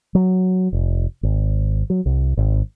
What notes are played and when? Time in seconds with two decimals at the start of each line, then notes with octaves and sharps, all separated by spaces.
0.15 F#3
0.73 F1
1.23 G#1
1.90 F#3
2.06 C2
2.37 G#1